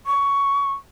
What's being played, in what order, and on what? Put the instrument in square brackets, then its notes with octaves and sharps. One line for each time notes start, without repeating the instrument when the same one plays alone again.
[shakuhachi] C#6